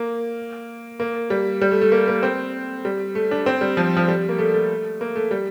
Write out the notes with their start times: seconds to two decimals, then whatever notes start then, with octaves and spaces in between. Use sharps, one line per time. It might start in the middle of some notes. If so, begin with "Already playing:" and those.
Already playing: A#3
1.00 A#3
1.30 G3
1.61 G3
1.71 A3
1.81 A3
1.92 A#3
2.08 A#3
2.23 C4
2.85 G3
3.15 A3
3.31 D4
3.46 C4
3.61 G3
3.77 F3
3.97 F3
4.08 G3
4.29 A#3
4.38 A3
4.54 A3
5.01 A#3
5.16 A3
5.31 G3